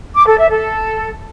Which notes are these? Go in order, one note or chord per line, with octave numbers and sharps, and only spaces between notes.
D6
A4
E5
A4